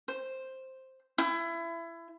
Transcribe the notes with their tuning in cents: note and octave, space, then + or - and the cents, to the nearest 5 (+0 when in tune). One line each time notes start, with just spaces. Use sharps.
C5 +5
E4 +25